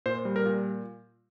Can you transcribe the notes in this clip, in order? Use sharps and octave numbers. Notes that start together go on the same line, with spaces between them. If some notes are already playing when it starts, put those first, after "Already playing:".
A#2 C5
G3
A#4
A#2